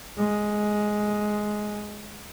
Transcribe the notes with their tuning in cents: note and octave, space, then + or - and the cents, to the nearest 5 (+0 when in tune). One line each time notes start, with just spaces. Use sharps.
G#3 +10